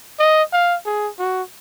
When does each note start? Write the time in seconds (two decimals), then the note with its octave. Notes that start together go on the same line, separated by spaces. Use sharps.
0.20 D#5
0.53 F5
0.86 G#4
1.19 F#4